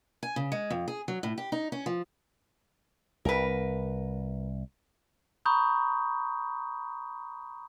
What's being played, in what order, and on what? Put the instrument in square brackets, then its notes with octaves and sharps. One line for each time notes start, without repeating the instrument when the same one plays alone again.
[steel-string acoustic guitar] G#5
C#3
G#3
F2
G#4
F#3
A2
G4
D#4
C#4
F3
[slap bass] C2 [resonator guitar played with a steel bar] A#4 B4
[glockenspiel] A#5 B5 C#6 D#6 G6